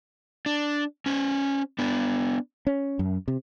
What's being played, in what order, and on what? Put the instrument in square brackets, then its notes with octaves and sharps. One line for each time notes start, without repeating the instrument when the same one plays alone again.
[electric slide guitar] D4
C#4 C5
B3 D4
[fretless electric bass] C#4
F#2
C3